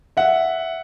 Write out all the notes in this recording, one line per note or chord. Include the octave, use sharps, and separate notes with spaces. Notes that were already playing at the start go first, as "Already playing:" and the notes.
E5 F#5